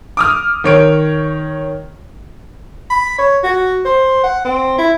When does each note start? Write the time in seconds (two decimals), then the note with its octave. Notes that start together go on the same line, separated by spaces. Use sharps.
0.17 D6 D#6 F6
0.64 D#3 C#5 D7
2.90 B5
3.19 C#5
3.44 F#4
3.85 C5
4.24 F#5
4.45 C4
4.78 E4